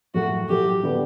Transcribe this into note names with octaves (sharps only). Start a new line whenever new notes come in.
A2 F#3 A3 F#4
A2 F#3 A3 G4
D3 G3 B3 D4 G4